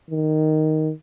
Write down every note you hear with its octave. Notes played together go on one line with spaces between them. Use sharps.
D#3